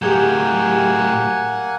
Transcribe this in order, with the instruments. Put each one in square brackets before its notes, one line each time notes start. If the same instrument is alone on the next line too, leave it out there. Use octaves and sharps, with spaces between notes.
[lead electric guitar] A2 F#3 [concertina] A#3 F#5 G#5 [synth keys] G4 G#4 G6